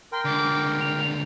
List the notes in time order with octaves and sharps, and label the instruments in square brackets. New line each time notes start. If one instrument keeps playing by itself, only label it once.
[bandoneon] A#4 G5 [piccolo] C6
[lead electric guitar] C#2 D3 [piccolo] D6
[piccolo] F7